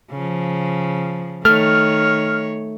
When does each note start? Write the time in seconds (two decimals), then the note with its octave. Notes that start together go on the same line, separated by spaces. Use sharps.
0.11 C#3 F3
1.45 D#3 A3 C#5 F6